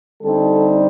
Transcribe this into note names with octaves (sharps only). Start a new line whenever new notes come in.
D3 G3 C4 D#4 A4